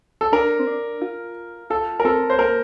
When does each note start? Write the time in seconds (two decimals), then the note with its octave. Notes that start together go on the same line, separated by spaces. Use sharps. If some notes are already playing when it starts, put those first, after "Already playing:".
0.21 A4
0.32 D4 A#4
0.59 C4
0.67 D4
1.02 F4
1.70 F4 A4
2.00 A#4
2.05 C4 A4
2.30 C5
2.39 A#3 A#4